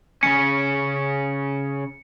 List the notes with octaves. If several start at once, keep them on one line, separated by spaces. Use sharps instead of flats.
C#3 C#4 C#7